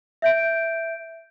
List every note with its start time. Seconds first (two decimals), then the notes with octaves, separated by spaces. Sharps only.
0.22 E5 G6 D7